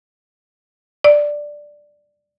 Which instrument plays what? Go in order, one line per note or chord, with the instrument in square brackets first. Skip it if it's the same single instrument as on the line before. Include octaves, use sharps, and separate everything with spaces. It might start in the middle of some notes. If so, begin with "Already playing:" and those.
[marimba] D5